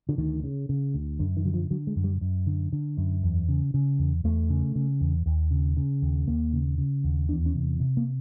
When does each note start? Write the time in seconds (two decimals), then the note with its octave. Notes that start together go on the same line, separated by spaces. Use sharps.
0.09 D3
0.18 D2 D#3
0.44 C#3
0.69 C#3
0.94 D2
1.20 F#2 D3
1.37 D#3
1.45 D3 F#3
1.54 F3
1.70 D3 F#3
1.87 G#3
1.96 F#2
2.04 G3
2.21 F#2
2.47 D3
2.73 D3
2.97 F#2
3.23 E2
3.49 C#3
3.74 C#3
3.99 E2
4.24 E2 A3
4.50 C#3
4.75 C#3
5.01 E2
5.26 D#2
5.51 C#3
5.77 C#3
6.02 D#2
6.28 D#2 A#3
6.53 C#3
6.78 C#3
7.04 D#2
7.29 E2 D4
7.46 C#4
7.55 C3
7.80 C3
7.97 A#3